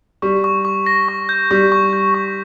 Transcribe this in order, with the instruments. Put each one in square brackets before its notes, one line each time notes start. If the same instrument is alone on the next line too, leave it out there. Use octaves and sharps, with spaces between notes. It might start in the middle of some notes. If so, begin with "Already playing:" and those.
[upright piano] G3 [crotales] C#6
[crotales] C#6
C#6
A#6
C#6
G6
[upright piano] G3 [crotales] C#6
[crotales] C#6
G6
C#6